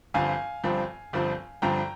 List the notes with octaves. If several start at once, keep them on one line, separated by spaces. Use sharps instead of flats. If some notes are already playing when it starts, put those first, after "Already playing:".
G1 G2 F3 C4 F5 G#5
G1 G2 F3 C4
G1 G2 F3 C4
G1 G2 F3 C4 G5 A#5